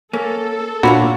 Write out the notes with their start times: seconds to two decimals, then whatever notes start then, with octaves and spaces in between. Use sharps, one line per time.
0.13 A#3 C#4 A4
0.83 A#2 D4 F4 F#4 C#5 B5